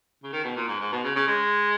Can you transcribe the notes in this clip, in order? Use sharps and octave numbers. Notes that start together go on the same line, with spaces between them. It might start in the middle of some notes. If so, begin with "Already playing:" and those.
C#3
D#3
B2
A#2
G#2
G#2
B2
C#3
C#3
G#3